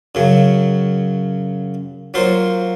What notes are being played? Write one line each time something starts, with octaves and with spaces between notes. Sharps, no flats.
F#2 C#3 F#3
F#3 A#3 F4 C5